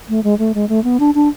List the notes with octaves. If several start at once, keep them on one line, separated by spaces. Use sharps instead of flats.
A3
G#3
A3
G#3
A3
B3
D4
D4